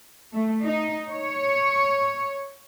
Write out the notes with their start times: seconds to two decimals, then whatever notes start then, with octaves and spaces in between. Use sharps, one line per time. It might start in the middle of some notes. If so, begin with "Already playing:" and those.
0.34 A3
0.64 D#4
1.10 C#5